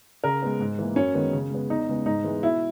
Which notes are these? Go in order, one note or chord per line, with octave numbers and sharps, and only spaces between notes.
C#3 A#4
G#3 B3
G#2
E3 A#3
F#2 C#4
D#3 G#3 B3
C#3
G#3 B3
E2 D#4
C#3 G#3 B3
G#2 D#4
E3 G#3 B3
B2 E4